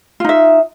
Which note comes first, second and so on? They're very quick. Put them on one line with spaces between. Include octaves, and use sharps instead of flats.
F4 D#4 E5